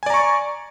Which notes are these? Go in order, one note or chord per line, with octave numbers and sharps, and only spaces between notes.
D5 G#5 A#5 C#6